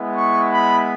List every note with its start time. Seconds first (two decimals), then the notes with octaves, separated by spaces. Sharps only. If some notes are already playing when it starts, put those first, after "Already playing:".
Already playing: G#3 B3 E4
0.16 C#6
0.52 B5